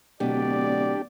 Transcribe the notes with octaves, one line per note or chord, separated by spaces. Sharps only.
D1 B2 D4 G4 D5